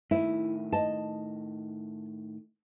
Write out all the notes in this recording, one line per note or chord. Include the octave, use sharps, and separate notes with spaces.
A2 D#3 E4
D#5 A5